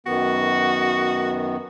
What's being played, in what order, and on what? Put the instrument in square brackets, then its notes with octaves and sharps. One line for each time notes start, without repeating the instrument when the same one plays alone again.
[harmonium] F#2 D#3 B3 [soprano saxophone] F#4